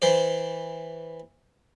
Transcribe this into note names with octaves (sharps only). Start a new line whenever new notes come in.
E3 C5 D5